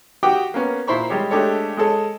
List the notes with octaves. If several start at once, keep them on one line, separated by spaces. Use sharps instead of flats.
F#4 G4 F#5 G5 D6 D#6
A#3 B3 C#4
A#2 E4 C5 B5 C#6
G3 G#3 G4 C#5
G#3 A3 D4 G4 A4 C#5
G#3 G#4 A4 C#5